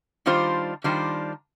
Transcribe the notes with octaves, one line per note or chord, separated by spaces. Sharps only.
D#3 G3 D4 F4 C5
D#3 G3 D4 F4 C5